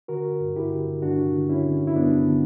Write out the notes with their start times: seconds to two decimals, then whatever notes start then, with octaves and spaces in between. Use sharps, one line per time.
0.08 D3 F#4 A#4
0.40 G2
0.56 E4 G4
0.72 D3
1.02 G2 D4 F#4
1.34 D3
1.49 C#4 E4
1.66 D3
1.87 E4
1.96 G2 B3 D4
2.28 D3